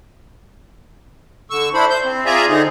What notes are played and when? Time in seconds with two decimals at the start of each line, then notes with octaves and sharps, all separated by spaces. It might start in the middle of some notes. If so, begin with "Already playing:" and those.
1.50 D3 C#6 E6
1.74 D4 E4 C5 B5
1.90 C5 G6
2.05 C4
2.26 F4 G#4 D5 E5 G#5 A#5
2.49 D3 C4 D#4 G#4